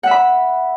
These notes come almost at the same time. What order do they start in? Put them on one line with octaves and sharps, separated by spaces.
F#5 E5 B5